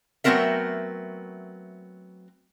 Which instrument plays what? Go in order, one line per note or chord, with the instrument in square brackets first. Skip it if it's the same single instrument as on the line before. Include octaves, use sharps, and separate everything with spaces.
[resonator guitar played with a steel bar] F#3 A3 B3 C4 A#4 E5